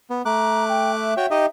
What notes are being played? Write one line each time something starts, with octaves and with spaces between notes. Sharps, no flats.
B3
A3 A#5 D6 F#6
G5
E5
F#4 C#5 G5
D#4 G4 D#5